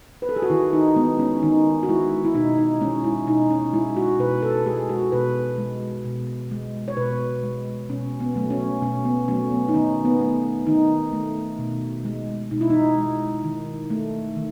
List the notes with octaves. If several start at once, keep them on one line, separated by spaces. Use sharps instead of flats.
B4
A4
G#4
F#4
D#3 E4
D#4
G#3 B3
C#4
D#3 D#4
F#4
G#3 E4
E4
B2 D#4
D#4
G#3 C#4
E4
B2 D#4
C#4
G#3 E4
F#4
B2 B4
A4
G#3 G#4
F#4
B2 B4
G#3
B2
G#3
C#5
B2 B4
G#3
B2 C#4
B3
F#3 A3
C#4
B2 C#4
B3
F#3 A3 C#4
B3
D#4
D#3 C#4
B3
A3
D#3 D#4
A3
B2
G#3
B2 D#4
E4
D#4
G#3
D#3
A3
D#3